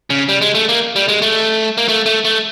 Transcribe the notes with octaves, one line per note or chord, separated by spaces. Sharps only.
C#3
G3
G#3
A3
A#3
G3
G#3
A3
A#3
A3
A3
A3